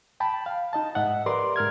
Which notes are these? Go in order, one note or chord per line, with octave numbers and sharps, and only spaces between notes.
G5 A5 B5
F5
D#4 D#5 A5
G#2 D#5 E5 F#5
G4 A#4 B4 D5 C6 D6
G#2 A#4 F6 G#6